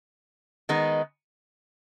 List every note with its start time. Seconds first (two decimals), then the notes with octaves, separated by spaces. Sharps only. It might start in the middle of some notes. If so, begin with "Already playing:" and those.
0.69 D#3 G#3 B3 D#4